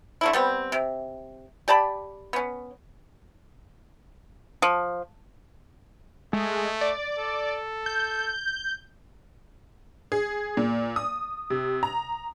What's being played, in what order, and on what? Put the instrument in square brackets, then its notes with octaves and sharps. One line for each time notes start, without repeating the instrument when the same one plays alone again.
[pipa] D3 A3 E4
G3 B3 C4
C3
G4 D5 A5 B5
B3 C#4
F3
[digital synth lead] G#3 [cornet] A3
[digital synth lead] D5
[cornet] A4
[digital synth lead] G6
[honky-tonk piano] G#4
A#2
D#6
C3
A#5